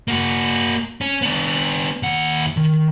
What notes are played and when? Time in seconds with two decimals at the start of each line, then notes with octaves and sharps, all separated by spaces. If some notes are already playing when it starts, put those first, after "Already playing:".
0.08 A#3 F#4
1.01 C#4
1.22 B3 D4
2.03 D#2 F#5
2.57 D#3